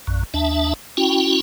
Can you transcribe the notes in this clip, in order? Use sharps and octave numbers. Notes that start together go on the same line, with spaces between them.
A#1 F#2
D#2 D4 E5 A5
C#4 E4 F#4 G5